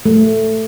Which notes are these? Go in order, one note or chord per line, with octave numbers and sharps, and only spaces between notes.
A3